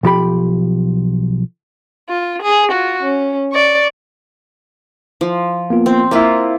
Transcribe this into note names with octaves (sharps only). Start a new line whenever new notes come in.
B1 F3 G4 B5
F4
G#4
F4 F#4
C#4
D5 C#6
F3
A#3 B3 F4
C4
A#3 E4 F4 C5 E5